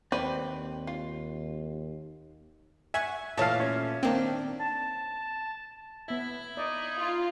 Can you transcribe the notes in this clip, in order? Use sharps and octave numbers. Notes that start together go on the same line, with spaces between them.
D#2 C4 B4 D5 G5
F4
E5 F#5 G#5 C#6
A#2 E3 A3 C#5 F5 A5 B6
C#4
D#3 A#3 C4 D4 G5
A5
B3 E4 E5
D#4 D5 D#5
F4